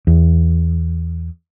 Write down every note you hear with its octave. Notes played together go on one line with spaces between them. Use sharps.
E2